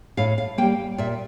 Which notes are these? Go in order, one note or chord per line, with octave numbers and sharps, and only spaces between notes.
A2 F5
F5
G3 A#3 G5
A#2 E5